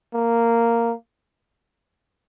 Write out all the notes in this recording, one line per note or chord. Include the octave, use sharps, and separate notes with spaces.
A#3